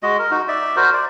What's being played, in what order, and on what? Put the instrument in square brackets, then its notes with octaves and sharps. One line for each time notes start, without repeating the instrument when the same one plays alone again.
[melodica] G#3 F#4 D#5
A#4
D#4 F#4
D5 E5
F#4 A#4 C5
D5